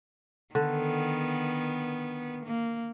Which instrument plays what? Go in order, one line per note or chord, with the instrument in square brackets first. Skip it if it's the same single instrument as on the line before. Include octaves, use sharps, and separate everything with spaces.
[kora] D3 [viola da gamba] D#3 B3
[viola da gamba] A#3